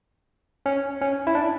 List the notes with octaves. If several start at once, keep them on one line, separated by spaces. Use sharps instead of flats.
C#4
C#4
E4
D4